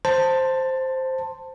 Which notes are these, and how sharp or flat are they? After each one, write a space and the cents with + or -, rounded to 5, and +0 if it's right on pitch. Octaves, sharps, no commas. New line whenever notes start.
C5 +0 A5 +15